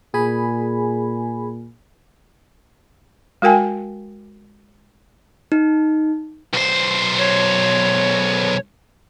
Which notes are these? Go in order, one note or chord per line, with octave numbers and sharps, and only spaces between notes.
A#2 G#4 G#5 B5
G#3 F#4 A#4 G5 G#5
D#4
B1 C5
C#5